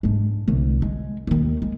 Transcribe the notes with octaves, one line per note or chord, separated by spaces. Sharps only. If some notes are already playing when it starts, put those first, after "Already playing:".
G#2 D4
C2 D3
G#3
D#2 D#3
G#3